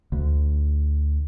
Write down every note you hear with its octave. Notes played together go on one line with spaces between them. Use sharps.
D2